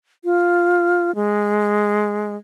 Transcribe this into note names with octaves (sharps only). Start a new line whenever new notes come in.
F4
G#3